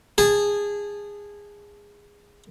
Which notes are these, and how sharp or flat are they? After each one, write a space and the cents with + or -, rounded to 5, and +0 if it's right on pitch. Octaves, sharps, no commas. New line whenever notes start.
G#4 -20 A5 -20